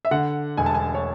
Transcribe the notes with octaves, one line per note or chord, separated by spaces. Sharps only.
E5
D3 F#5
E1 G#5
A5
G#5
C#5